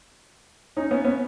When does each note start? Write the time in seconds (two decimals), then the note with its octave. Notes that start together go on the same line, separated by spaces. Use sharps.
0.77 C#4 D#4
0.91 B3 C#4
1.04 B3 C#4